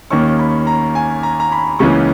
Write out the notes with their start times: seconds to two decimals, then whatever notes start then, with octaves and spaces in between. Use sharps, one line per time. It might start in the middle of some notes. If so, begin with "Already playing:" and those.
0.10 D#2 D#3 A#3 C#4 C#6
0.39 B5
0.67 A#5
0.95 G#5
1.23 A#5
1.40 A#5
1.52 B5
1.79 C#2 C#3 E3 A#3 C#4 C#6